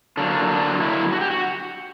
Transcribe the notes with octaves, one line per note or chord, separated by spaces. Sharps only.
D3 F#3 A#3 D4
D4
E4
F#4
G4
F#4